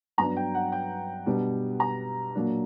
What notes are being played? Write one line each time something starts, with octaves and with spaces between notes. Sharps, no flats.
G2 F#3 B3 D4 A#5
G5
F#5
G5
B2 G3 B3 D4
A#5
A#2 F#3 A#3 D4